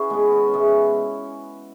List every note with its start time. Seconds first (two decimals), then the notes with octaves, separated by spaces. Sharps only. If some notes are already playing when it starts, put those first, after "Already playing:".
Already playing: C#4 E4 F#4 G#4 B4
0.10 B2 G#3 B3
0.32 C#4
0.48 C#4
0.53 B2 G#3 B3 E4
0.68 C#4